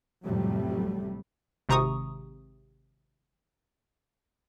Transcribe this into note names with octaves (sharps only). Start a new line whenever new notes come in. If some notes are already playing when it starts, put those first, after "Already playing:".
A1 F2 C3 F#3 G3 A3
G#1 C3 A#5 C#6 D#6